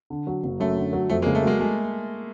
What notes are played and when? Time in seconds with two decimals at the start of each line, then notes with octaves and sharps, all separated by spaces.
0.10 D3
0.27 F#3
0.44 F#1
0.60 F#2 A3
0.76 D3
0.93 F#3
1.10 F2 A3
1.22 G#3 A#3
1.26 C#3
1.35 A3
1.43 F#3 G#3 A#3
1.60 G#3 A3